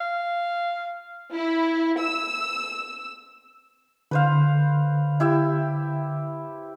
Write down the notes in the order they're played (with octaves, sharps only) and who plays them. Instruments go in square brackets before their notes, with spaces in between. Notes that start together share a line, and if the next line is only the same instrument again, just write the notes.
[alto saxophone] F5
[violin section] E4
E6
[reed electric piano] D3 [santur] B4 C5 F5
[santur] E4 G4 E5